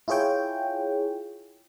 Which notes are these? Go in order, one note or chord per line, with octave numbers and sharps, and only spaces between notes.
E4 F4 G#4 C#5 G5